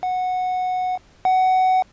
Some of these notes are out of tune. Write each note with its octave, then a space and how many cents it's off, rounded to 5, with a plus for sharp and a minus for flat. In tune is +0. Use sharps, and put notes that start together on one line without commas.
F#5 -10
F#5 +15